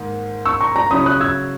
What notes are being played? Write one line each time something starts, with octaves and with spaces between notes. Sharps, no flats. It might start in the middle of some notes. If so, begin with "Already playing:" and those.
Already playing: G#2 D#3 A#3
C#6 E6
A#5 C#6
A#5 C#6
C#3 F#3 C#4 E4 B5 D#6
D#6 F#6
E6 G#6